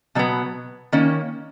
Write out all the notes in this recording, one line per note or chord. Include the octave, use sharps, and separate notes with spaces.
B2 F#3 B3
D#3 A#3 C#4